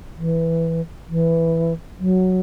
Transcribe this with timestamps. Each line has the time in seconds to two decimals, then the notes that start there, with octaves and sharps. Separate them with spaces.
0.17 E3
1.09 E3
1.99 F#3